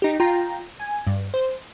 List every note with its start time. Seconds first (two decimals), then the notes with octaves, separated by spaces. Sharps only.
0.02 D#4 G4
0.20 F4 G5 A#5
0.80 G#5
1.07 G2
1.34 C5